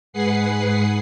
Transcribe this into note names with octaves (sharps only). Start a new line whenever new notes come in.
G#2 G#4 B4 F#5 C7